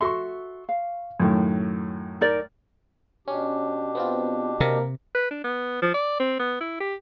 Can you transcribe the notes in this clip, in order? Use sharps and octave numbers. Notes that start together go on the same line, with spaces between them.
F#4 A4 E5 C6 C#6
F5
F#2 A2 D#3
D#4 A#4 D5
B2 C#4 D4 G4
B3 C4 F4
C3 A#3 C4 A#4
B4
D4
B3
F3
D5
C4
B3
E4
G4